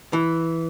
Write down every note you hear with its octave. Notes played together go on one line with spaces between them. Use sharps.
E3